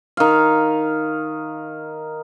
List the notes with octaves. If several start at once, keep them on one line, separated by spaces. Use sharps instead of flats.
D#3 F5